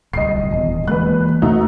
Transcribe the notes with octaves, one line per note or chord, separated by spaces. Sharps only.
D1 C2 D#5 C7
D#1 E2
E3 G#3 A#3 B4 F#6
E2 C3 A3 D#4 F#4